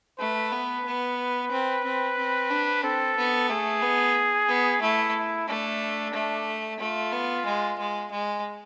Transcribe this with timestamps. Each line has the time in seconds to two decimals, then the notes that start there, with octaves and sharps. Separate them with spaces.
0.20 A3 B4
0.53 B3
0.86 B3
1.52 C4
1.85 C4
2.18 C4
2.51 D4
2.83 C4 A4
3.17 B3
3.50 A3 G#4
3.83 B3
4.49 B3
4.82 A3 E4
5.48 A3 D4
6.14 A3
6.80 A3 F4
7.13 B3
7.46 G#3
7.79 G#3
8.12 G#3